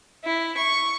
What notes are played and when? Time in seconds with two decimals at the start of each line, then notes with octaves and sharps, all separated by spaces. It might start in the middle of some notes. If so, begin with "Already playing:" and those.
0.25 E4
0.58 C#6